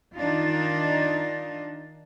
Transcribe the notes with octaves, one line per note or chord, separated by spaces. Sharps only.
D#3 D4 D#4 F4